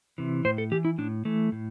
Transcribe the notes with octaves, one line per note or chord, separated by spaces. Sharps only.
C3 E3
A2 C5
A4
E3 G4
E4
A2 D4
E3 A3
A2